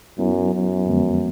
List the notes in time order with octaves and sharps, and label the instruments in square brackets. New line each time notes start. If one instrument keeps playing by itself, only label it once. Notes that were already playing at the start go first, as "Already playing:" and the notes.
[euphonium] F#2 [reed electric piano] F#3 B3 E4
[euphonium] F#2
[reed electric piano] F2 D3 F3 G#3 B3